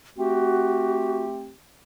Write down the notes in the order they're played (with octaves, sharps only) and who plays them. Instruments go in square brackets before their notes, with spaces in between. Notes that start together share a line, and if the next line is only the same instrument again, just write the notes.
[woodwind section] A3 C4 G4 [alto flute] F#4